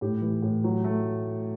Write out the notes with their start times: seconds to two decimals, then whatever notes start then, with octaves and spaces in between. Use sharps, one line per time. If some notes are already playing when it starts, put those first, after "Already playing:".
0.01 A2 G4
0.22 E3
0.42 A2
0.64 F#3
0.84 A3